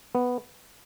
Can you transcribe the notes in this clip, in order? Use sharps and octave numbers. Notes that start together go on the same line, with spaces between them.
B3